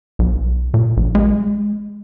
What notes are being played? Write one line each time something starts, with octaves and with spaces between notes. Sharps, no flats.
B1
A#2
A#1
G#3